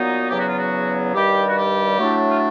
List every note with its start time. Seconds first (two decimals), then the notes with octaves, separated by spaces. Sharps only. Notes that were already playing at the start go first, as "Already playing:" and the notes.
Already playing: A#2 F#3 B3 D#4
0.30 E2 C#3 F#3 B3 G4
0.39 F#4
0.49 F4
0.57 F#4
1.14 G2 D#3 G3 G4
1.48 F#4
1.56 G4
1.98 A2 F#3 A3 D4
2.30 F4